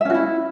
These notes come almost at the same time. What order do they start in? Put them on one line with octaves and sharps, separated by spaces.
E5 C#4 F#4 E4